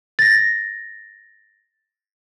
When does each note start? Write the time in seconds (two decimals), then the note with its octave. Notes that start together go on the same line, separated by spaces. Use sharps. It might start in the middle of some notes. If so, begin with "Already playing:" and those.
0.19 A6 A#6